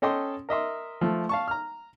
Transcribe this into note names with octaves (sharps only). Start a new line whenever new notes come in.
C#4 A4 D#5 G5 C6
A#4 D#5 E5 C6
F3 A3
F5 A5 C#6
A#5 F6